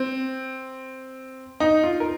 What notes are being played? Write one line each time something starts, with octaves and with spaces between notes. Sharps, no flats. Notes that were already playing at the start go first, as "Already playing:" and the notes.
Already playing: C4
D#4
F4
A#4